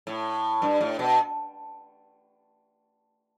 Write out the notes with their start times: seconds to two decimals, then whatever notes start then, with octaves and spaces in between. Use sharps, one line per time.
0.07 A2
0.62 G2
0.81 A2
0.99 B2